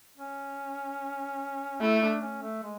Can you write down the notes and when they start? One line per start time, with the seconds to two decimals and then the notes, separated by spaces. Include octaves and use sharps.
0.17 C#4
1.81 A3 E4
2.02 D4
2.21 C#4
2.42 A3
2.63 G#3